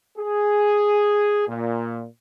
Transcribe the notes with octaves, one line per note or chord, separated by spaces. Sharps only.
G#4
A#2